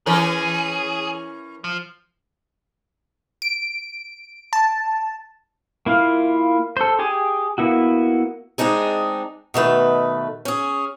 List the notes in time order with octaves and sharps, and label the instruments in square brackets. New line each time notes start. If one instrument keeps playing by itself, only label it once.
[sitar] E3 C#4 A#4 [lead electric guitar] G#4
[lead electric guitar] F3
[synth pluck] D7
A5
[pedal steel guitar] A#3 E4 F4 F5
A4 C5
G4 G#4 G#5 D6
A#3 B3 E4 F#4
[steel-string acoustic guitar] G#3 C4 D4 D#4 G#4
B2 D#3 A3 B4
C#4 G#4